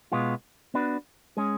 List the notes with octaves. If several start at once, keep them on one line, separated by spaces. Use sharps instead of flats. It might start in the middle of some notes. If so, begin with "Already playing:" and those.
B2 G#3 B3 F4
B3 D4 F#4 B4
G#3 C#4 G#4